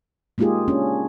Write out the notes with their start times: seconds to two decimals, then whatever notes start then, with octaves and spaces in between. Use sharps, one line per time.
0.38 G#3 A#3 D#4 F4 G4 G#4
0.68 C#4 D4